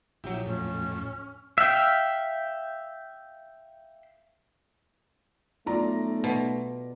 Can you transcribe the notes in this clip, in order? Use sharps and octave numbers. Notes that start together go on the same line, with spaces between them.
A#1 F#3 E4 G4
F2 A2 C#4
E5 F5 G5
B1 A3 F4 D5 A#5
B2